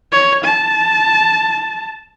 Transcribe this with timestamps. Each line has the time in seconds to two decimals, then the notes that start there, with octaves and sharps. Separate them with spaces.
0.12 C#5
0.44 A5